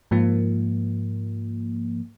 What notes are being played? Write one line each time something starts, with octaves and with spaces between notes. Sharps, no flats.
G#2 F3 A#3